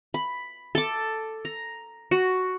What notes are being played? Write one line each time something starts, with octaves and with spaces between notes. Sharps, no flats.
B5
A4 D6
A#5
F#4